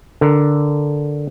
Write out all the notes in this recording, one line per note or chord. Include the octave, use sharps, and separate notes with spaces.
D3 A#4